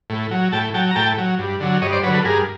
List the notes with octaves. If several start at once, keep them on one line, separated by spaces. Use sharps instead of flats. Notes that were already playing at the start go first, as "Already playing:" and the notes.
A2
F#3
A2 G5 A5
F#3 G5 A5
A#5
A2 G5 A5
F#3
G2
D3 F#3
G2 C#5 D#5
C5 D5
D3 F#3 B4 C#5
A4 B4
G2 G#4 A#4